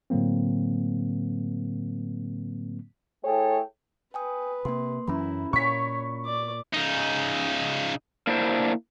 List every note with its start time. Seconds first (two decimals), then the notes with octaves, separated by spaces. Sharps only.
0.10 A2 D3 F#3 A#3 C4
3.25 A3 E4 G#4 A4 C#5 G5
4.14 B4 G5 G#5 D#6
4.65 C3 A#3 C6
5.08 F#2 E3 F#3 C#4 E4 A#5 B5
5.53 A#2 C#5 C#6 B6
6.25 D5 D6
6.74 C#3 D#4
8.27 A#3 D4 E4 C5